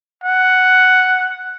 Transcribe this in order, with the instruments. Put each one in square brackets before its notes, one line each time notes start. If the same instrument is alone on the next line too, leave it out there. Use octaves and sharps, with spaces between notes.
[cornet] F#5